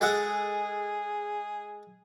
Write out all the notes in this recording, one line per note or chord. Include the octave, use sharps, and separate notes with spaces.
G#3 G#4 A4 F#5